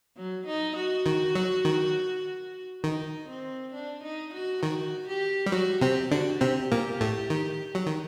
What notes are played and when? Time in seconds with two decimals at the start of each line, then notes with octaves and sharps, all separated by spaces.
0.17 F#3
0.46 D#4
0.76 F#4
1.06 D#3
1.35 F#3
1.65 D#3
2.84 D#3 D#4
3.28 C4
3.73 D4
4.03 D#4
4.34 F#4
4.63 D#3 F#4
5.07 G4
5.46 G3
5.52 F#3 F#4
5.81 C3 C4 G4
6.11 D3 D4 F#4
6.41 C3 C4 G4
6.72 A#2 A#3
7.01 A2 A3
7.30 D#3
7.75 F#3
7.86 D#3